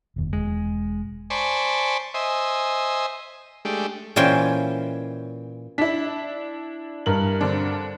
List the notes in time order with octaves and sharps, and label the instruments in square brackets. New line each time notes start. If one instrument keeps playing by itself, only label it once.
[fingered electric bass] F1 D#2
[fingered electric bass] E1 [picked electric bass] G#3
[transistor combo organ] C5 D5 G#5 A5 B5 C#6
C5 D#5 E5 G#5
G#3 A3 D4 G4
[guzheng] A#2 E3 C#4 C5 G5 G#5
[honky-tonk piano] D4 E4 [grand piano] B6
[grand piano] G2 A#4 F#7
[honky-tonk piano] D3 C4 D4